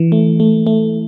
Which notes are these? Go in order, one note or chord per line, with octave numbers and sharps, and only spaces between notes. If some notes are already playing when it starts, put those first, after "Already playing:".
Already playing: E3
A3
A3
A3